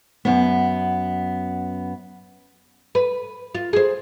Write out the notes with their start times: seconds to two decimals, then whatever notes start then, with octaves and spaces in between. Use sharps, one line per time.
0.25 F#2 B3
2.95 B4
3.55 F4
3.73 G#4 C5